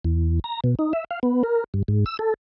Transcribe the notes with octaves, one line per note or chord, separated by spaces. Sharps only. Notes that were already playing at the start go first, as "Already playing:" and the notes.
E2
A#5
B2
D#4
E5
F5
B3
A#4
G2
G#2
E6
A4